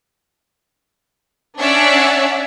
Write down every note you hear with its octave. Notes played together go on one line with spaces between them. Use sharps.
C#4 D4 C#5 D5 E5 F#5